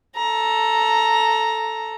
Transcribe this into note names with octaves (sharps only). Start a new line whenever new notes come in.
A4 A#5